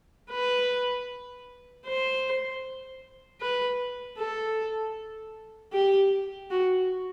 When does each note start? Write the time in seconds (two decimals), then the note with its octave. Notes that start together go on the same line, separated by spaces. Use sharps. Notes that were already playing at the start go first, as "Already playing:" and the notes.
0.31 B4
1.86 C5
3.41 B4
4.18 A4
5.73 G4
6.51 F#4